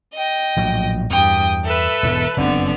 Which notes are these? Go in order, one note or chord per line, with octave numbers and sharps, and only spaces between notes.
D#5 G5
A#1 A2 F#3
E2 G2 G5 D#6
A4 B4 E5
E1 E2 G#2
F#1 F2 D3 B3 C4